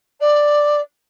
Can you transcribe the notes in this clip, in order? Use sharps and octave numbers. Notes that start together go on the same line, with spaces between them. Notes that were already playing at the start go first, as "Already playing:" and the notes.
D5